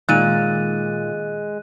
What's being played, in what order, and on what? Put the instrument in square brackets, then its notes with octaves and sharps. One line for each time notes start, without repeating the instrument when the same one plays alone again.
[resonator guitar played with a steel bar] A#2 [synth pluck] D#3 [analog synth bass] G#3 [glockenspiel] F#6 D#7